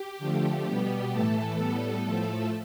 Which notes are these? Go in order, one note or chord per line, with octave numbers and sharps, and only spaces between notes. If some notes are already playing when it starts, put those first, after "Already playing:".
Already playing: G4
D3 F3 A3
B2 G3 B3
A2 E3 A3 A4
A2 G3 B3
A2 F3 A3